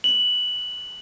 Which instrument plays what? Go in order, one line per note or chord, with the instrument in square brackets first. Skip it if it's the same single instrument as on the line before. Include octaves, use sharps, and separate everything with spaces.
[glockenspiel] F#7